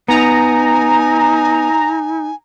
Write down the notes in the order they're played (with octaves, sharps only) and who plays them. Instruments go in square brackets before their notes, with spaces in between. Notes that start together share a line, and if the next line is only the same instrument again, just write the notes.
[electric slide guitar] B3 [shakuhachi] D#4 [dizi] G#5 [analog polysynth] A#5